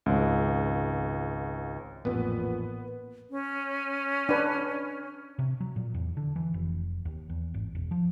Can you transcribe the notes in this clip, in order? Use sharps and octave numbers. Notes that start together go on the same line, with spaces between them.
G#1 C#2
A1 F2 A#2 B3
C#4
D4 B4
C3
F#3
A#2
E2
D3
E3
F1
D#2
E2
G#1
E1
F3